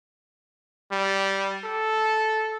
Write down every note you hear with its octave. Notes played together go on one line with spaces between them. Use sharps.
G3
A4